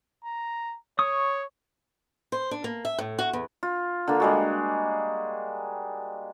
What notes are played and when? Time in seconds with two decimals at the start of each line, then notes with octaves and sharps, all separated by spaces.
0.24 A#5
0.99 C#5 C#6 D#6
2.32 C5
2.51 D4
2.64 A#3
2.85 E5
2.98 A2
3.19 F#4
3.33 E2
3.63 F4
4.07 D3 A#3
4.20 G3 G#3 F#4